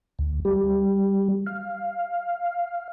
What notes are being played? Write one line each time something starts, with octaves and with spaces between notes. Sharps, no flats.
D2
G3
F5